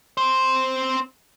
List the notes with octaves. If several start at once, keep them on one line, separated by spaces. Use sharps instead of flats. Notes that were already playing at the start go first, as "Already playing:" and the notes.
C4 C5